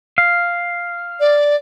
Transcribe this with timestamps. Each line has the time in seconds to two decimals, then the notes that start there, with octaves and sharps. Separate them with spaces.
0.18 F5
1.20 D5